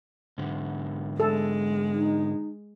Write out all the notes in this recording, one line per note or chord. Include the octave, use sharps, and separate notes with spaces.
G#2 D3
G#3 A4
D#4